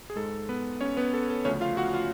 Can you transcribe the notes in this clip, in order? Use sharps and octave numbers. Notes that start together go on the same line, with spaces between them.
G#4
G#2 G#3 A4
B3 B4
C#4 C#5
B3 B4
A4
A4
D2 C#3 F3 A3 C#4 C#5
F4 F5
F#4 F#5
F4 F5